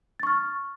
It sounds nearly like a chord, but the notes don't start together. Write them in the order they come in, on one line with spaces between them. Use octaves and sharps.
A6 C#6 F6